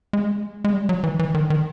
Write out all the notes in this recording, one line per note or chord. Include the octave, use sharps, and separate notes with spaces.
G#3
G#3
G3
F#3
E3
E3
D#3
D#3